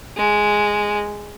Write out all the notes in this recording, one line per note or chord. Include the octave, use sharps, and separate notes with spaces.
G#3